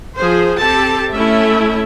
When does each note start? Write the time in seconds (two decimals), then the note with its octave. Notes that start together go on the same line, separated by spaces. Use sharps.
0.17 F3 G#4 C5
0.59 C4 G4 A4 A5
1.13 A3 C#4 E4 E5